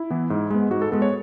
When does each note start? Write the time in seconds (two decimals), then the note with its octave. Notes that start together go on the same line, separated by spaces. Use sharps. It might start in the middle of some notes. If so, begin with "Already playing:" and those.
Already playing: E4
0.10 E3 B3
0.30 G#2
0.50 G#3 B3
0.71 G#2 F#4
0.82 A4
0.92 G#3 B3 A4
1.02 C#5